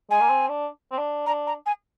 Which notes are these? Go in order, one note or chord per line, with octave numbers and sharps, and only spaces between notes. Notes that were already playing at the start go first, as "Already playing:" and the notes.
G#3 G#5
A#3
C4
D4
C4
D4
D4 A#5
A#5
G#5